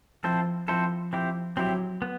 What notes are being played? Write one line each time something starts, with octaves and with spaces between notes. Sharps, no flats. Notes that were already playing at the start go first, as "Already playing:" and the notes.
F3 C4 E4 A4 C5
F3 C4 E4 A4 C5
F3 C4 E4 G4
F#3 C4 E4 G4
B3